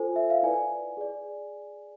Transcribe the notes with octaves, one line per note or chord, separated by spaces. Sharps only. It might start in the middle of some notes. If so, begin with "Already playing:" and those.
Already playing: F4 A4 C5 G#5
E5
F5
E4 B4 D5 G#5
G#4 D5